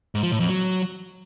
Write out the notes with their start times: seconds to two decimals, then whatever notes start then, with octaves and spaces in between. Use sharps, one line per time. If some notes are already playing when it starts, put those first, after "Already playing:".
0.15 G#2
0.23 F3
0.32 A2
0.40 F2
0.49 F#3